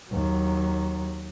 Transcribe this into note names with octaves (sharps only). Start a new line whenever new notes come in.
D#2 F#3